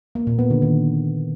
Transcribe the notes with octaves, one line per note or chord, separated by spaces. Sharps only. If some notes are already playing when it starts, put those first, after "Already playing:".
A#3
A#2
B3
D3
D#3